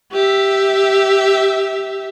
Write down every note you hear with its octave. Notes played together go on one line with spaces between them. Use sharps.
G4 E5